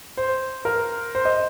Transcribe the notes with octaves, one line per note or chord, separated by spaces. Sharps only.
C5
A#4
C5
D#5